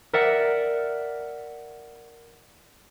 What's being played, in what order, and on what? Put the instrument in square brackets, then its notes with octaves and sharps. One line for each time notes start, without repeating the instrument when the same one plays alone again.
[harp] A#4 D5 E5 F#5